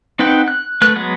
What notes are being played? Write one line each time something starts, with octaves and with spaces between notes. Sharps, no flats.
C4 D#4 B4 F#5 G5
F#6
A3 B4 F#6
F#3 G#3 B3